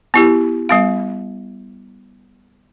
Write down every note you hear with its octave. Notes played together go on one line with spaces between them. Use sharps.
B3 E4 G4
G3 B3 F5